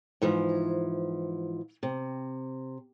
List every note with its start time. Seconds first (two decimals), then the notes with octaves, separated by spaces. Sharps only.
0.22 G#2 E3 F3
1.83 C3